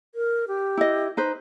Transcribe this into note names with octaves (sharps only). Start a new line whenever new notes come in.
A#4
G4
E4 D#5
D#4 B4 C5